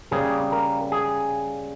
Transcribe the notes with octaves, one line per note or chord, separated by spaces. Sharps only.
C#3 G3 A#3 G#4
A#4
G#4